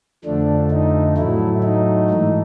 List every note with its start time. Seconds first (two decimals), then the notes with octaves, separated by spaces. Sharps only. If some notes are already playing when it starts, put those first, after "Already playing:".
0.25 F2 D3 F3 A3 D4
0.71 D#4
1.17 A2 F#3 A3 E4
1.64 D#4
2.10 G#2 E3 A3